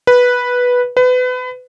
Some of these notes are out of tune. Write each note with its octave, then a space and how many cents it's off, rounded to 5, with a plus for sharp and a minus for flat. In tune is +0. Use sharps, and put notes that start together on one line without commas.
B4 -5
B4 +30